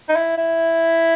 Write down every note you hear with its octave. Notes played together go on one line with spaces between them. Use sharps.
D#4
E4
E4